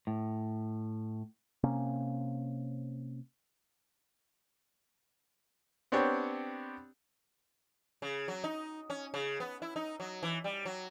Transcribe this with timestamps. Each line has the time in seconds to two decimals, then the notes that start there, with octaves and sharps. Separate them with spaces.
0.07 A2
1.63 C3 A#3 C#4
5.92 B3 C4 D4 G4 C#5 G5
8.02 C#3
8.28 F#3
8.44 D#4
8.90 C#4
9.14 C#3
9.40 B3
9.62 E4
9.76 D#4
10.00 F#3
10.23 E3
10.44 G3
10.65 F#3